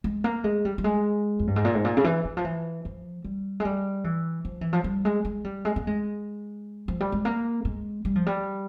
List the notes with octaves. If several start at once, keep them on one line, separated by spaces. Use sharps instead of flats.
G#3
A#3
G#3
G3
G3
G#3
F2
G2
G#2
A#2
G#2
A#2
C#3
E3
E3
F3
E3
F3
G3
G#3
G3
E3
F3
E3
F3
G3
G#3
G#3
G3
G#3
A#3
G#3
F3
G3
G#3
A#3
G#3
G3
F3
G3